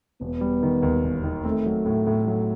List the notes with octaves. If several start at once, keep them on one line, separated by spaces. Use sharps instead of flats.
E1 B3
G3
D#3
D#2
E1
D#3
A3 C4
F#3
A2
A2
F#3